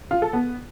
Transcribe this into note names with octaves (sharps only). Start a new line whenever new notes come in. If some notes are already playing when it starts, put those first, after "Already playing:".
F4
A4
B3